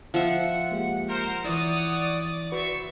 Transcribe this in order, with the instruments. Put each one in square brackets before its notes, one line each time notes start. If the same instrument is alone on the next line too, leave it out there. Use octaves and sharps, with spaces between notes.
[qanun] F3 E5 [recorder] F#5
[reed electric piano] G#3 A#3 G4
[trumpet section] A#4 C5
[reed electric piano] E3 E4 [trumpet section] C#5 F#5 D#6 [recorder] D5
[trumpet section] C4 E5 C#6 [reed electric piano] F#4 B4